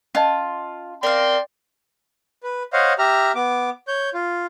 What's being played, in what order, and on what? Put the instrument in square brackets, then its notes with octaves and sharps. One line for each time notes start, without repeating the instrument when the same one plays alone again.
[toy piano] C#4 D#5 A5 [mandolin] F4
[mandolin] A#4 F5 [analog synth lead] D5 [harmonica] G5 C6
[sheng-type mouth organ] B4
C5 C#5 D#5 F5 F#5
G4 E5 A#5 F6
B3 D6
C#5 G6
F4